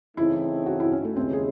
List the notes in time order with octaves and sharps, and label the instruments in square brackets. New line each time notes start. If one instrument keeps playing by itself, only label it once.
[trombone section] C#3 E3 A3 C4 D#4 [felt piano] E4
[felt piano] F#4
E4
C#4
A3
[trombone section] D#2 C#3 E3 G#3 C#4 [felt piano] C4
[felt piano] G#4